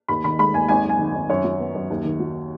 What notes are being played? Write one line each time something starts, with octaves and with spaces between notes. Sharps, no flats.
D#2 B5
D#3 B5
G#3 B5
D#2 G#5
G#1 G#5
F#2
G#5
D#3
G#1
F#2 C#5
F#3
B3
F#2
D#2
D#3
F#3